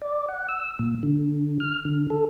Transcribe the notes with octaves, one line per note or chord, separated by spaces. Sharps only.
D5
F#5
E6
A#2
D3
F6
D3
A4